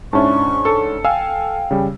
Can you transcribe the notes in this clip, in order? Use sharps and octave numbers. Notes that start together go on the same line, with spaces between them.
G#2 C#4 D4 E4 A5 C#6
A4
F5 G5 G#5 E6
C#3 G3